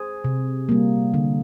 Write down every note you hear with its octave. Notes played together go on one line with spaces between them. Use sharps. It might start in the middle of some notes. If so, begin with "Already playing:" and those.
Already playing: G#4 C5
C3
G3 A#3
D3